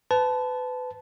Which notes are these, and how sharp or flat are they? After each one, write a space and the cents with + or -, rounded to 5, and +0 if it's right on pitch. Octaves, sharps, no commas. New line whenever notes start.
B4 +30 A5 -15